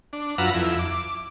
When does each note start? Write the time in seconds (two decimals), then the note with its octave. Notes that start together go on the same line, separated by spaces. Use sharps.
0.13 D4
0.38 F#2 F4 B4 F#5 A#5 E6
0.54 F2 E4
0.79 D6